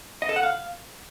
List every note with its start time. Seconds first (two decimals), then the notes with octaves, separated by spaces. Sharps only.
0.22 D#5
0.29 A4
0.36 F#5
0.43 F5